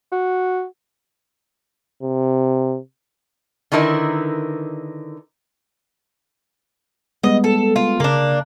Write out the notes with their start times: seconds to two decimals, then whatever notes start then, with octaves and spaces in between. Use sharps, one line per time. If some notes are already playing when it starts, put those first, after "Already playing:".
0.12 F#4
2.02 C3
3.72 D3 D#3 D#4 E4 A#4 B4
7.24 G3 G#3 B3 D#5
7.44 A4
7.76 F4
8.00 C#3 A#3 D4